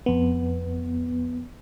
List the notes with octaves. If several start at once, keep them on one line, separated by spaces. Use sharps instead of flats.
F2 B3